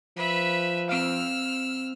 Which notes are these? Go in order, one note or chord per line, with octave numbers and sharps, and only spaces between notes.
F3 B4 E5
C4 F5 E6 F6